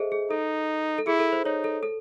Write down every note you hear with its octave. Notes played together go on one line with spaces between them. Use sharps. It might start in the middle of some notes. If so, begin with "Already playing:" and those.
Already playing: G#4 A4 C5 D#5 E5
G#4
D#4 A4
A4
E4 G#4
A4
C5
D#4 C#5
A4
A4